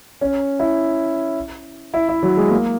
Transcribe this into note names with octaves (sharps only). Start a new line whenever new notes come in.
C#4
E4
E4
E4
F#3
G#3
A#3